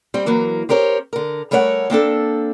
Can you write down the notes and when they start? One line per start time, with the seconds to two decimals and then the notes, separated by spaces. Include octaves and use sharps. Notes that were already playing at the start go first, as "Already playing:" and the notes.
0.14 G3 C4
0.26 E3 F#3 A#3 A#4
0.69 C4 G4 A#4 C5 C#5
1.13 D3 A#4
1.51 G3 A3 A#4 C#5 E5 F#5
1.90 A#3 C4 D4 A4